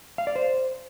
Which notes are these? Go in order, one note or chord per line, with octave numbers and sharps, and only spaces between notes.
F5
D5
C5